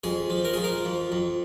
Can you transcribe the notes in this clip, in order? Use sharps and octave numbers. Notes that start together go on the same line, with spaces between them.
F2 G#4
F3
A#4
F3 G#4
A#4
F2
F2